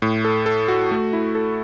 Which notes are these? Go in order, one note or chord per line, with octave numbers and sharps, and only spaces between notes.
A2
A4
A4
F#4
A3
E4
A4